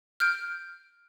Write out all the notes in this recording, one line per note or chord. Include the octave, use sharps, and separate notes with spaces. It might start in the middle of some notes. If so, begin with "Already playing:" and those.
F6 G6 D7